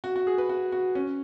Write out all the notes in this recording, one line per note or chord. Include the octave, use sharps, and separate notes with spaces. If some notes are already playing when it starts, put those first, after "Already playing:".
F#4
F#4
G#4
B4
F#4
F#4
C#4